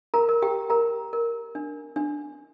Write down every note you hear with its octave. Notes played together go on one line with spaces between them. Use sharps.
A#4 A#5
A#4
G4 G5
A#4 A#5
A#4
D4
D4